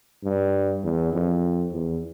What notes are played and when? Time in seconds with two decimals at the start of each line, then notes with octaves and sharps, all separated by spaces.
0.24 G2
0.84 E2
1.13 F2
1.72 E2